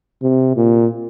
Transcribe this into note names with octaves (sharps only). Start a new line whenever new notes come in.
C3
A#2